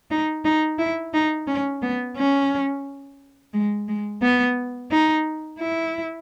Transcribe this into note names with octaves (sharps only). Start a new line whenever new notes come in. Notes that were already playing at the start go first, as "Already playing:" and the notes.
D#4
D#4
E4
D#4
C#4
B3
C#4
G#3
G#3
B3
D#4
E4